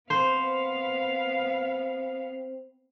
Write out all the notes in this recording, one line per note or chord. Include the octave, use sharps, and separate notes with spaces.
B3 C4 C5 F5